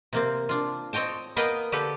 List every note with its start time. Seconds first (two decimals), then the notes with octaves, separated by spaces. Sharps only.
0.13 C3 A#3 C4
0.49 D4 F4
0.93 C4 C#5 D#5 G5 A5
1.36 A#3 B3 B4 D#5 F5 G5
1.72 D3 D4 G4 A4 B4